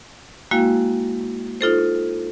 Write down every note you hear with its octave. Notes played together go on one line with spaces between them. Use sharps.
G#3 A#3 E4 F#4 F5 G5
D#4 F4 A4 C5